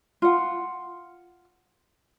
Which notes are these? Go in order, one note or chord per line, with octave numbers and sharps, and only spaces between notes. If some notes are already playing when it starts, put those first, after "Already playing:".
F4 F#5